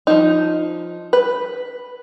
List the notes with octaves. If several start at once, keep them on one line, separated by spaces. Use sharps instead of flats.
F3 D#4
B4